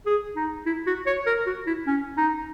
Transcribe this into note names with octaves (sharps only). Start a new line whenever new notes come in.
G#4
D#4
E4
F#4
C#5
A#4
F#4
E4
C#4
D#4